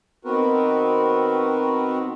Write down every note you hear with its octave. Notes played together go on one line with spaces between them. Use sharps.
D#3 B3 C4 F#4 A#4 B4